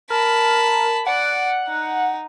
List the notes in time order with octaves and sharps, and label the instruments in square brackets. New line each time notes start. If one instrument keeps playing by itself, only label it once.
[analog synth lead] A#4 [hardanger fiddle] A5 B5
[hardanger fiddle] D5 [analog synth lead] F#5
[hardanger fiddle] D#4